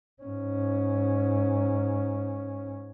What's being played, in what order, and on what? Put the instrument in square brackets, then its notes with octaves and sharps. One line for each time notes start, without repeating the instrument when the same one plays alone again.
[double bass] G#2 C#4